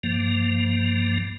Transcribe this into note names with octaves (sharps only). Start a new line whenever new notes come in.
G2 F3 A#3